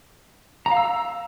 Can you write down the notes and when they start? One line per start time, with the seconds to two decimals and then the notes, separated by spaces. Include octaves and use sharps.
0.66 A#5
0.71 F5
0.77 E6